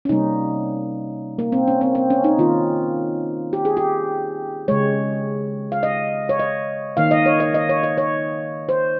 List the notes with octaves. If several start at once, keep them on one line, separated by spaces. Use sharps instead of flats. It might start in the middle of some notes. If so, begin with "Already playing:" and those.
C#4
C3 G3 A#3 D#4
A#3
C4
C#4
C4
C4
C#4
D#4
D#3 A#3 F4
G4
G#4
G4
C#3 G#3 C#5
F5
D#5
C#5
D#5
D#3 A#3 F5
D#5
C#5
D#5
D#5
C#5
D#5
C#5
C5